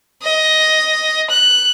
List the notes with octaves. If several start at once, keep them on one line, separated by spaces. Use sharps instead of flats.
D#5
F#6